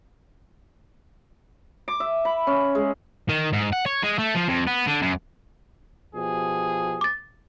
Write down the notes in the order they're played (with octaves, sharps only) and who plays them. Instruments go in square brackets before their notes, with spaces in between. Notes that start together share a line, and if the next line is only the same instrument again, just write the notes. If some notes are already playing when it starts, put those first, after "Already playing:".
[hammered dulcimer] D6
E5
B5
C#4
G#3
[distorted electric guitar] D#3
G#2
F#5
C#5
G#3
A3
F3
F2
B3
D3
F#2
[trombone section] B2 F3 G4 [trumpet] G#4
[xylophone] D6 A6